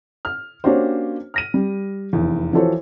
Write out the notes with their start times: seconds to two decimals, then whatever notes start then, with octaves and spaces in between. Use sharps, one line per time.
0.25 F6
0.64 A#3 C#4 D4 F#4 G4 C5
1.34 F6 A#6 D#7
1.54 G3
2.13 F1 E2
2.53 E3 F3 F#4 A4 C5 C#5